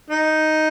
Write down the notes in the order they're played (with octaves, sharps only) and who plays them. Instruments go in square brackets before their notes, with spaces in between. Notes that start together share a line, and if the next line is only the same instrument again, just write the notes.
[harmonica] D#4